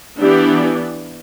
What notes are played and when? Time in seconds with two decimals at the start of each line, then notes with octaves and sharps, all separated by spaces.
0.19 E3 B3 D4 E4 G4